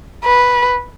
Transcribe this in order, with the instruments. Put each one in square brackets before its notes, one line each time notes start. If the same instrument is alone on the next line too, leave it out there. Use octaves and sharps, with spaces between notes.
[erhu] B4